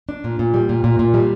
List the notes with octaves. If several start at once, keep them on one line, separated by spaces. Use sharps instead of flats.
D4
A#2
A#2
G3
A#2
A#2
A#2
G3